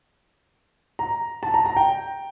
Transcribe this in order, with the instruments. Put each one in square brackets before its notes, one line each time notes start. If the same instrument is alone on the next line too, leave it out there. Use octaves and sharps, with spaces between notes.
[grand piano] A#5
A5
A#5
A#5
G5